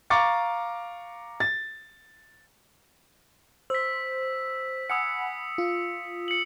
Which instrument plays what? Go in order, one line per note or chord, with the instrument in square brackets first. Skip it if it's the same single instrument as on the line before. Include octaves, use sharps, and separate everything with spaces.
[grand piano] F5 A#5 C#6 D6 A6 C#7
A6
[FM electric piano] C5 [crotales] E6 B6
[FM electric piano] F#5 G#5 B5 [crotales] D#6 E6 C#7
[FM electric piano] F4
[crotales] C#7 F#7